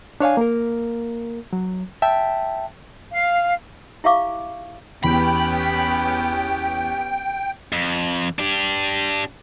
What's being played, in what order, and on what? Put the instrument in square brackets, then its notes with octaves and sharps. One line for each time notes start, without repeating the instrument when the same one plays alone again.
[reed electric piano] D4 C#5 F5 G#5
A#3 A#4
F#3
E5 G5 A5
[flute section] F5
[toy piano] E4 G4 E5 F5 C#6 D6
[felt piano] E2 [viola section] B3 C#4 G4 [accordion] G5 [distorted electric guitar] B5
[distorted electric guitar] F2
D4 G4